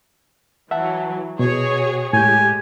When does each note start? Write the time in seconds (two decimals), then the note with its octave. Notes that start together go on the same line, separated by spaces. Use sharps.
0.71 E3 F#3 E5 F#5 A5
1.39 B2 F#4 G#4 C#5
2.13 A2 G#3 G4 G#5 G6